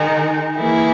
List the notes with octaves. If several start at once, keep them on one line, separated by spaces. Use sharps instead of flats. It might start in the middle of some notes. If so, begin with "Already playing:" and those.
Already playing: D#3 G#3 D#4
E3 A#3 E4 G#4